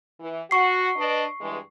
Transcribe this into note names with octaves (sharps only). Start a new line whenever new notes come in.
E3
F#4 C#6 C7
D4 B4 D#5
G2 E3 G#3